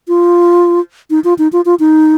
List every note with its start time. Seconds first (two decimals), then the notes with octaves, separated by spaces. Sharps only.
0.08 F4
1.10 D#4
1.24 F4
1.38 D#4
1.53 F4
1.65 F4
1.80 D#4